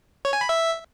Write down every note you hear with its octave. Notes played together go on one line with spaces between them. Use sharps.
C#5
G#5
B5
E5